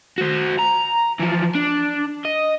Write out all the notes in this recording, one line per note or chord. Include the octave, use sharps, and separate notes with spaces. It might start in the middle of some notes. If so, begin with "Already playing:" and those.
F#4 C5
A#5
E3 F3
D4
D#5